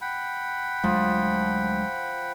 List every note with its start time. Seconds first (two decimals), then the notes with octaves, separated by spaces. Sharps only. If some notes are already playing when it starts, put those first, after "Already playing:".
0.01 F#5 G5 B5
0.84 D2 F3 F#3 G#3